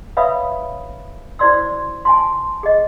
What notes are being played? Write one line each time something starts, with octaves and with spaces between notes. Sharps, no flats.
B4 C#5 E5 F5 B5 D#6
E4 F#4 C5 D5 C6 E6
G#5 A5 C6
G#4 D#5